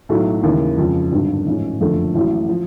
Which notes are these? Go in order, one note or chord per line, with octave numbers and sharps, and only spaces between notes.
B1 A2 F#3 A3
D#2 C#3 E3
F2 C#3 F3 G#3
G#1 G2 D3 F#3
A1 G#2 F3 G#3 C#4
F#1 F2 D3 F3 A3
A1 A2 F#3
F3